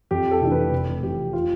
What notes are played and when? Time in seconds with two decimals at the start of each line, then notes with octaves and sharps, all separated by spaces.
0.11 F2 G4
0.31 A4
0.41 C3 E3 A3 D4
0.52 B4
0.73 F1
1.02 F2 C3 E3 G4
1.33 F4